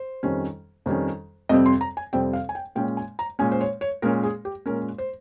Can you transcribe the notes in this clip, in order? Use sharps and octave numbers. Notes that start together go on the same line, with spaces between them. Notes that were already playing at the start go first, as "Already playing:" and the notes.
Already playing: C5
F2 D#3 G3 C#4
F2 D#3 G3 C#4
F2 C3 G3 C4 D#5
C6
A#5
G#5
F2 C3 G3 C4 G5
F5
G#5
G5
A#2 G#3 C#4 G5
G#5
A#5
A#2 G#3 C#4 G#5
C5
C#5
C#5
A#2 G#3 C#4 A#4
G#4
G4
A#2 G#3 C#4 A#4
C5